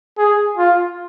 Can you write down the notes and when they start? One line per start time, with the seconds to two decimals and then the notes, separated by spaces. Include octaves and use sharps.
0.18 G#4
0.58 F4